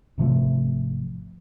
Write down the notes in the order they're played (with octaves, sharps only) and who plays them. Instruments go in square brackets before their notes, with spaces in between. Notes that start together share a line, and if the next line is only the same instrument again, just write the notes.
[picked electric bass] G#1 C3 F3 A3